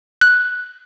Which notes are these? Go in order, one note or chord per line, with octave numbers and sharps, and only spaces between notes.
F#6